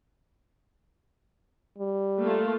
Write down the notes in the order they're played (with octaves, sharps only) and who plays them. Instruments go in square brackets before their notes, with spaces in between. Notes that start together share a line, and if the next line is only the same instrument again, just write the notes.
[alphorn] G3
[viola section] A3 A#3 F4